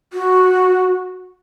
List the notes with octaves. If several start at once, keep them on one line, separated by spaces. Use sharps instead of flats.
F#4